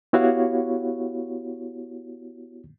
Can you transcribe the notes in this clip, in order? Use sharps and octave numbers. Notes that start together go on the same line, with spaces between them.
B3 E4 F#4 G4 C#5 F5